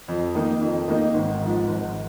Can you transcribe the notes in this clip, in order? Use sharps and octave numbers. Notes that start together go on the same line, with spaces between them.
F2
D#3 A#3 D#4
F2
D#3 A#3 D#4
G#1
G#2 F3
G#1